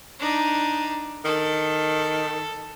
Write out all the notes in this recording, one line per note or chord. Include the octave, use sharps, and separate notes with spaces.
D4 D#4
D#3 A4